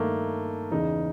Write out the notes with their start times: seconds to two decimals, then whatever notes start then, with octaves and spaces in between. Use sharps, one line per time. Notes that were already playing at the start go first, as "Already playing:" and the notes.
Already playing: G2 D#3 A3 A#3
0.71 E2 C#3 E3 D#4